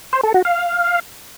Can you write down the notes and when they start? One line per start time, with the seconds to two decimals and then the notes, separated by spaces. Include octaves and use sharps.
0.13 C5
0.24 A4
0.34 F#4
0.45 F5